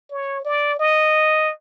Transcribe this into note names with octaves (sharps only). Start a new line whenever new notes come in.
C#5
D5
D#5